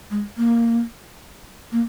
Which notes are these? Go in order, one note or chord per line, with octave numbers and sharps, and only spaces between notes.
G#3
A#3
A#3